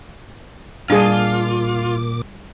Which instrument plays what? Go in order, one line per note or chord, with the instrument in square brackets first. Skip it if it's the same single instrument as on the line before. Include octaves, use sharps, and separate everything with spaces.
[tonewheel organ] A#2 D6 [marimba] G3 [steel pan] D4 G#4 [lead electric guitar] F4